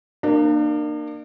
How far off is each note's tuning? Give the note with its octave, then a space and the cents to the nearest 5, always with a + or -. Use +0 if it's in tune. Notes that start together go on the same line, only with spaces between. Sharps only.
A#3 -5 D4 +40